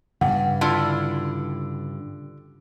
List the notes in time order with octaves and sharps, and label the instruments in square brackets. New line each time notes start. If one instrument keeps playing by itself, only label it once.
[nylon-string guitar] G2 [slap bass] C#3 B3 [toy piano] F#5
[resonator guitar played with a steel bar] D3 E4 F4 [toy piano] A5